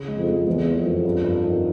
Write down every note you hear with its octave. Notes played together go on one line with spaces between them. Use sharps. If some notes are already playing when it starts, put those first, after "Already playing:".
Already playing: C#3
G#3
F2
G#3
E2 G#3
G#3
F2
F#2
G2
G2
D#3